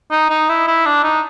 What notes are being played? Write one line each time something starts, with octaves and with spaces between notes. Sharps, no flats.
D#4
D#4
E4
E4
D4
D#4